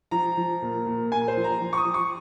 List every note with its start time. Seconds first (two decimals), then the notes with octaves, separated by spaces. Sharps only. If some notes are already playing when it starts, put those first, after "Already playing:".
0.11 F3 A#5
0.37 F3
0.62 A#2
0.87 A#2
1.11 A#2 G#5
1.28 C5
1.37 F3
1.44 A#5
1.61 F3
1.73 C#6
1.78 D#6
1.85 F3
1.94 C#6